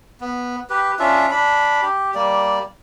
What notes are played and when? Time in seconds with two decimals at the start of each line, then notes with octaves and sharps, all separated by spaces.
0.21 B3
0.70 G4 B4
0.99 C#4 D4 F4 E5
1.31 D4 B5
1.82 G4
2.15 G3 A#3 D5